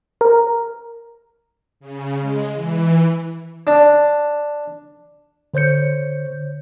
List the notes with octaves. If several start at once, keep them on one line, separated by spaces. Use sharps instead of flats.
A#4
C#3
G#3
E3
D4
D3 C5 C#5 G6 C#7